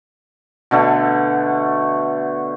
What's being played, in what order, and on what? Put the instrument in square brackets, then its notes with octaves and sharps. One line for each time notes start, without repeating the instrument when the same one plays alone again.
[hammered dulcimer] B2 D3 A3